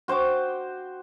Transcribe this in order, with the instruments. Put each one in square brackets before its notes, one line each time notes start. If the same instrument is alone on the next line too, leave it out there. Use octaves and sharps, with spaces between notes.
[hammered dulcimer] F#4 C5 G5 D6